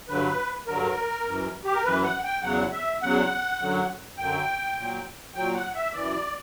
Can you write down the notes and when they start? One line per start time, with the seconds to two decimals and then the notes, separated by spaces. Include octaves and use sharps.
0.08 G2 D3 F#3 B4
0.67 G2 D3 F#3 A#4
1.26 F#2 E3
1.64 G4
1.73 A#4
1.84 F#2 E3 B4
2.03 F#5
2.24 G5
2.42 E2 C#3 F#3 F#5
2.72 E5
3.01 E2 C#3 F#3 F#5
3.60 F#2 D3 F#3
4.18 F#2 D3 F#3 G5
4.77 A#2 F#3
5.35 A#2 F#3 G5
5.55 F#5
5.75 E5
5.93 F#2 E3 D5